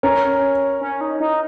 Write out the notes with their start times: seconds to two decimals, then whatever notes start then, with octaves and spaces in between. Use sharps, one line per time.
0.03 C#4 A#4 C#5
0.81 C#4
1.01 D#4
1.20 D#4